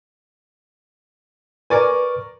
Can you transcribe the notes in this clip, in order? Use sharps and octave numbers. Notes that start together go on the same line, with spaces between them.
A#4 B4 D5 G#5 C#6